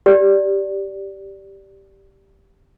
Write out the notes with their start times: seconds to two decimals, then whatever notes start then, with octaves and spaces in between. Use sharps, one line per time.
0.06 G4 D5